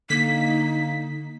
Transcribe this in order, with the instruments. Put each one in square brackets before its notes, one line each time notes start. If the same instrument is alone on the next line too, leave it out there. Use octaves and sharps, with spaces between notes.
[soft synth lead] D3 [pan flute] A#3 [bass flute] D#4 [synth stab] B6